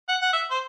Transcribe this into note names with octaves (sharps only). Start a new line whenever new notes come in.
F#5
F#5
E5
C5